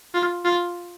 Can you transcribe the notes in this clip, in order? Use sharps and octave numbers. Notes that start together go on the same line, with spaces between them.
F4
F4